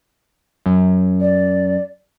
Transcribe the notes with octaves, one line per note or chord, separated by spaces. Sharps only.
F#2
D5